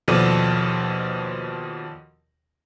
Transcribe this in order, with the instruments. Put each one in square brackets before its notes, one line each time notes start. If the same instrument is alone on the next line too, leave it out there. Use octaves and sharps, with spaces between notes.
[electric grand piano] D#2 B2 F3 A4 D5 D#7